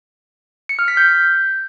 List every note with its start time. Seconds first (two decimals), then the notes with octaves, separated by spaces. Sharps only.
0.69 C#7
0.79 F6
0.88 B6
0.97 G6